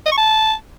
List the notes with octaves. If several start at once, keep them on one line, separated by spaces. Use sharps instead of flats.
D#5
C#6
A5